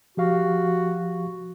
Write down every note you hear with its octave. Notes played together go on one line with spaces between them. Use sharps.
F3 F#4 G4 F5